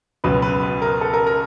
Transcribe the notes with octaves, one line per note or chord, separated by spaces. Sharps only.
C#2 B2 F#3 B4
B4
B4
A#4
A4
A#4
A#4